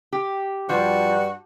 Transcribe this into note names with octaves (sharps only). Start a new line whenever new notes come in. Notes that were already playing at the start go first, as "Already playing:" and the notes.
G4
G2 F3 F#4